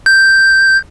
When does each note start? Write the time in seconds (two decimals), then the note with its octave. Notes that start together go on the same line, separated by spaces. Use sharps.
0.06 G6